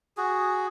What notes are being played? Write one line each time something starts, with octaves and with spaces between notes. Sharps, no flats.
F#4 G#4